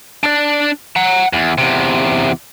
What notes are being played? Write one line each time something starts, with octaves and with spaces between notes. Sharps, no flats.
D4 D5
F#5 A#5
E2
E2 C3